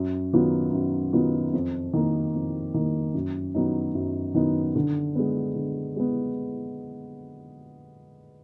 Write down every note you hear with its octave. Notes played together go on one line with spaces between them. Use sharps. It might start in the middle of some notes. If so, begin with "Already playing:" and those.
Already playing: F#2
D#3 F#3 B3 F4
F#2
D#3 F#3 B3 F4
F2
D#3 A#3
F2
D#3 A#3
F#2
D#3 F#3 B3 D#4
F#2
D#3 F#3 B3 D#4
D3
G#3 B3
D3
G#3 B3